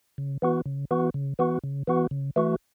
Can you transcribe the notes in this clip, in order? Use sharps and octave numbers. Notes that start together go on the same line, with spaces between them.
C#3
E3 B3 F#4
C#3
E3 B3 F#4
C#3
E3 B3 F#4
C#3
E3 B3 F#4
C#3
E3 A3 F#4